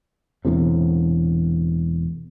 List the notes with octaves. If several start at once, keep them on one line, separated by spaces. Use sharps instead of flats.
E1 E2 A2 C3